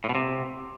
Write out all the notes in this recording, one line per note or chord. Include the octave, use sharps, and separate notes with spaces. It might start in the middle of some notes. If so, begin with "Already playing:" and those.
A2
B2
C3